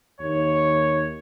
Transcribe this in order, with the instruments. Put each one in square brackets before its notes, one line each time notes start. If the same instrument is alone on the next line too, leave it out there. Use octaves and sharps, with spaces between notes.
[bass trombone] D#2 [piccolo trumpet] C#5